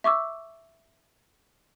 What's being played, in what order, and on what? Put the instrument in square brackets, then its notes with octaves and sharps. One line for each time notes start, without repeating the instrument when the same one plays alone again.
[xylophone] E5 C#6 D6 E6